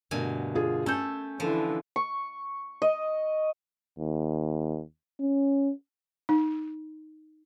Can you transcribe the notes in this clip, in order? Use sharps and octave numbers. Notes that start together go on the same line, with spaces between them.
G2 B2 D3 A3 A#3 G#5
D4 F4 G#4
A3 C#4 A4 G#5 G6
D3 E3 F3
C#6
D#5
D#2
C#4
D#4